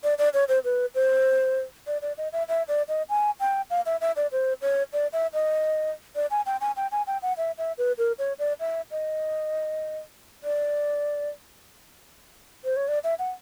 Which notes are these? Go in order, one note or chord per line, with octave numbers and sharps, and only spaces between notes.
D5
D5
C#5
C5
B4
C5
D5
D5
D#5
E5
E5
D5
D#5
G#5
G5
F5
E5
E5
D5
C5
C#5
D5
E5
D#5
D5
G#5
G5
G#5
G5
G#5
G5
F#5
E5
E5
B4
A#4
C#5
D5
E5
D#5
D5
C5
C#5
D5
E5
F#5